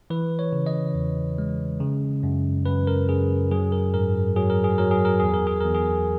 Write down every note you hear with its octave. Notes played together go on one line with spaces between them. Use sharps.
E3 B4
C#5
C#3
D#5
E2
G#3
C#3
F#2
F#2 B4
A#4
F#2 G#4
F#3 G#4
A#4
G#2 A#4
F#3 G#4
A#4
G#4
F#3 A#4
G#4
A#4
E2 G#4
A#4
G#4
E2 A#4
G#4